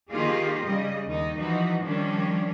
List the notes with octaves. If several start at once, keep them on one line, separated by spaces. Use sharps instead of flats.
D#3 A#3 D#4 F4 G4 G#4
C#3 G3 D#5
D#2 D#4
E3 F3 D#4 F#4
D#3 F3 G3 C#4 D4